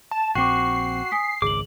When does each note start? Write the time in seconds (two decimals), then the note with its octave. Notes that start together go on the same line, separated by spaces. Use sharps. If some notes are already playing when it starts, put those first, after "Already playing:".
0.11 A5
0.35 A#1 C4 F#4 G5 C#6 D6 C7
1.11 G#5 D#6 B6
1.42 G#1 C#2 G#4 D6 F#7